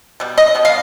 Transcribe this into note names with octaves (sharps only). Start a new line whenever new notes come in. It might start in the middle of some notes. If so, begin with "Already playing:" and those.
B2 G3
D#5
B2 G3
F5